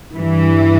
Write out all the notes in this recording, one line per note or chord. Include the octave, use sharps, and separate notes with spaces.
G2 E3